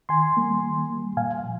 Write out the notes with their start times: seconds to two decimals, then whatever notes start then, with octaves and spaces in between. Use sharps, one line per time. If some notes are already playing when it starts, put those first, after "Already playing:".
0.09 D#3 G#5 C6
0.37 G3 A#3
0.63 D#3
0.90 G3 A#3
1.16 A#2 F5 G#5
1.43 F3